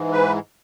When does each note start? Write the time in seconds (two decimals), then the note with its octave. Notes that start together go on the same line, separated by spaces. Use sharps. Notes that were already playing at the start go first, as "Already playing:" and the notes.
Already playing: G#2 E3
0.13 B4